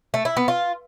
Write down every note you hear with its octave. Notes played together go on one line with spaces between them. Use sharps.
A3
E4
B3
F4